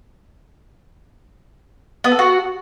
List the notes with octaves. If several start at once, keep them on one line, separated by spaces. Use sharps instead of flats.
B3
A4
F#4